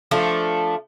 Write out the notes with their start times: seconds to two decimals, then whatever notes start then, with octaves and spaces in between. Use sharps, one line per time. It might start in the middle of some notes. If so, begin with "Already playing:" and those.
0.11 F3 A3 D4